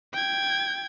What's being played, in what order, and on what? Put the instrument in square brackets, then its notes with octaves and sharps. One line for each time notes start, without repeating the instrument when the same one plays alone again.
[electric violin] G5 G#6